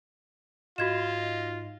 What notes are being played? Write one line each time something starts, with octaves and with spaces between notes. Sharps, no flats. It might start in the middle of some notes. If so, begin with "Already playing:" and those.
G#2 F4 F#4 D#5 G#6 E7